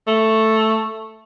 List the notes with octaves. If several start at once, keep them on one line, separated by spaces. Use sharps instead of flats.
A3